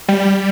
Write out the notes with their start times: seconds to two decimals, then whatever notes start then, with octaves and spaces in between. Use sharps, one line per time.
0.08 G3